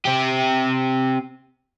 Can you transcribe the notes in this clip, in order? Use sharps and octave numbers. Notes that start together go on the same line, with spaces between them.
C4 G4